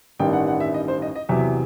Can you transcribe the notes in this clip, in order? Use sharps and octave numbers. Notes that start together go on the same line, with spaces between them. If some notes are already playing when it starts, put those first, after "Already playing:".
A1 G2 D#3 G3 G5
F#5
F#5
E5
D#5
C5
D#5
D#5
E2 C3 F#3 E5